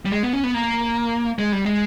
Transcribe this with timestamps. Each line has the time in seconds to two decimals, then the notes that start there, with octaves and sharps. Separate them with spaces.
0.05 G3
0.12 G#3
0.23 B3
0.33 C#4
0.44 B3
0.54 A#3
1.39 G#3
1.52 G3
1.65 G#3